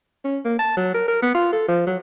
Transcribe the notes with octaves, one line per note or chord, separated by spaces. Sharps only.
C#4
A#3
A5
F#3
A#4
A#4
B3
F4
A4
F3
F#3